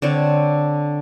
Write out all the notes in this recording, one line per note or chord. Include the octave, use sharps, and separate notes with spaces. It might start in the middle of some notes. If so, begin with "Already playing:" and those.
D3 C4 D4 C#5